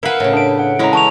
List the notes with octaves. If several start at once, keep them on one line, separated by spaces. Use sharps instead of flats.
E4 A#4 B4 F5 F#5
A2 C#3
D4 D7
F#5
G#3 C#4 E4 E5 A#5
E3 A5 C#6 F7